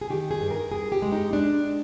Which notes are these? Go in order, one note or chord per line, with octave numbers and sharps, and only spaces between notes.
G#4
D#3 G4
G#4
G2
A#4
G2 G#4
G4
G#3
D#4
G#3 D4